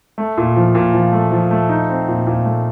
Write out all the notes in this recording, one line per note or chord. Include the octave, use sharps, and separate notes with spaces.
A3
A#2
F3
A#2
F3
A3
F3
A3
D#4
C4
A#2
A#2
A3